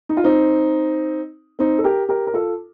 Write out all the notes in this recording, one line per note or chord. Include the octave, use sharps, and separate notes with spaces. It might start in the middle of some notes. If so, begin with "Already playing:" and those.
D#4
F4
C4 D#4
C4 D#4
A4
G4 A#4
G4 A#4
A#4
F4 A4